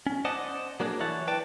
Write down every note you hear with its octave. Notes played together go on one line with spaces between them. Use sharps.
C#4
C5 D5 D#5 F#5 A5
F#3 A#3 D4 G4 G#4
E3 E4 C#5 F#5 A5
B4 D5 G5 A5